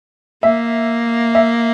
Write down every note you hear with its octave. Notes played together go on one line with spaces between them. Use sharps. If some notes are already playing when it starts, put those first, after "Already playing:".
A#3 E5
E5